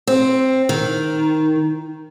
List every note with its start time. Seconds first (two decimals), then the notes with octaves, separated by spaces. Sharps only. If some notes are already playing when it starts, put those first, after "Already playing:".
0.07 C4
0.69 D#3